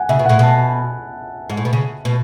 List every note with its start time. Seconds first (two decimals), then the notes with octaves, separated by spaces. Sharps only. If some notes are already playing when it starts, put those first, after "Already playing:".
Already playing: F#5 G#5
0.09 C#3 E5
0.19 B2
0.26 A2 F#5
0.39 B2 A5
1.50 G#2
1.57 A2
1.65 B2
1.73 C#3
2.05 B2